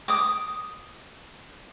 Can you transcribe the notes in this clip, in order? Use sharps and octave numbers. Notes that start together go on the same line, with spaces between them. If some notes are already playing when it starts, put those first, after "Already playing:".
D6 D#6